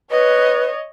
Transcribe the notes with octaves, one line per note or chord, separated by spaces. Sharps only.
B4 C#5 D#5